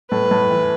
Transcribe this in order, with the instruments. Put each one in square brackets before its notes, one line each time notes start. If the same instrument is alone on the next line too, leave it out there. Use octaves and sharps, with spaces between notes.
[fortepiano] A2 [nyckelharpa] B4
[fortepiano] A2
E3